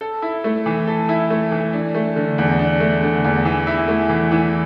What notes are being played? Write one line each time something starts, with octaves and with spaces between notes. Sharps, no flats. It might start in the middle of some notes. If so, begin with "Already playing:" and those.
A4
E4
A3
E3
A4
E4
A3
E3
D4
A3
D3
E2
D4
A3
D3
E2
E3
E4
A3
E3
E3